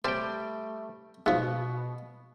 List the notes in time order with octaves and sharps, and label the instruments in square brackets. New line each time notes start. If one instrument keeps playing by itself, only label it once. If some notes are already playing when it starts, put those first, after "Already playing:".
[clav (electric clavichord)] G3 G5 [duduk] A3 [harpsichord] C5 A5
[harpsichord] G#2 F3 [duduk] B2 [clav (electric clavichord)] B3